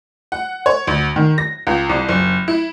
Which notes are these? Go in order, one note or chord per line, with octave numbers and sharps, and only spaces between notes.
F#5
C#5
D2
D#3
A#6
C#2
C2
F#1
E4